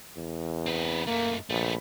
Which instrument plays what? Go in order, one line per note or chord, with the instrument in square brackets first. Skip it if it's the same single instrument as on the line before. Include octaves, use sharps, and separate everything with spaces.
[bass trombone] E2
[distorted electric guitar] C4 B4
[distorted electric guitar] F#2 A3 [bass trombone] A#3
[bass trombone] A#1 [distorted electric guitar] A3 B3